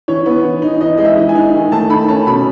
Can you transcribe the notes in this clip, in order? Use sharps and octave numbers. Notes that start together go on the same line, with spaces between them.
E3 C#5
B3
E3
D#4
E3 D#5
G#3 D#5
E5
E3
G#5
D#4
D#3
A3 A5
D#3 B5
C#4 A5
B2 B5